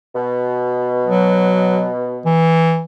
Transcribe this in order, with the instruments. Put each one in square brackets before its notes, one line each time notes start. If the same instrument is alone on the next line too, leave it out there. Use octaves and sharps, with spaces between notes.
[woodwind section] B2
[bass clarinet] F#3
E3